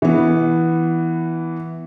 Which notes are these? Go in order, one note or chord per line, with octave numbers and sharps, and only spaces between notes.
E3 B3